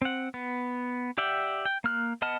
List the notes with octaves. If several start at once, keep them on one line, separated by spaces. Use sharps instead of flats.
C4 F#5
B3
G4 D5 E5 F#5 G5
G5
A#3 F6 F#6
B3 D#5 F#5 A5 F6